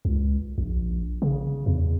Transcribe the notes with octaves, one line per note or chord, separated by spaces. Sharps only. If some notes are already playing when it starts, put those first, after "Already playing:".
C#2
A#1
C#3
E2